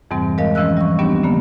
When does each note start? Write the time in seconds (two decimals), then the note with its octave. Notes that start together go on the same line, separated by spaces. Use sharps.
0.11 F2 G#2 C3 E3 G3 C4
0.38 G#3 A#4 D#5 F5
0.55 E3 F3 C#4 D#5 E6 F#6
0.76 G3 C#6
0.99 G3 B3 C4 D4 G4
1.23 D3 D#3 A#3 B3